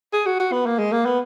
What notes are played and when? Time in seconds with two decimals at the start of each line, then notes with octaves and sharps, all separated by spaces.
0.13 G#4
0.26 F#4
0.39 F#4
0.52 B3
0.66 A#3
0.79 G#3
0.92 A#3
1.06 B3